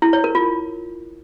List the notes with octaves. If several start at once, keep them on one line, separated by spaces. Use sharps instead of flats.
E4
C#5
A#4
F4